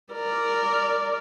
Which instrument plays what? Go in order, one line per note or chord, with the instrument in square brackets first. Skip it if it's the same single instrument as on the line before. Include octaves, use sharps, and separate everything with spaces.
[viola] A#4 D5